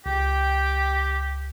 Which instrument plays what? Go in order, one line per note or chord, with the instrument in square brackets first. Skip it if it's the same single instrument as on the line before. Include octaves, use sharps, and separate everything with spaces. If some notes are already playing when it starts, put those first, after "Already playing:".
[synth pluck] C#2 [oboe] G4 [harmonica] G5